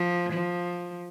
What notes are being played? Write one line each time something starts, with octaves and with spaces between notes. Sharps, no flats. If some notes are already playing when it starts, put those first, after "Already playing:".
Already playing: F3
F3